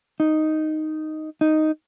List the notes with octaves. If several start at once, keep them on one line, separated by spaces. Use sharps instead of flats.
D#4
D#4